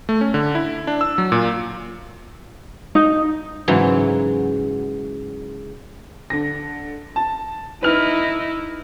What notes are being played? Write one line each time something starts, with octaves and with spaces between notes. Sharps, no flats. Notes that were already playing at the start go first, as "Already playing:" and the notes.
A3
C#4
D3
E4
D4
E6
F#3
A#2
D#4
G#2 C#3 E3 F#3
D3 A#6
A5
D#4 E4 B4 F6